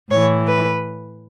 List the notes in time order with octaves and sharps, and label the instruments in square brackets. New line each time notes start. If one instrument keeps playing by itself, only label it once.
[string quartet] A2 E3 C#5
B4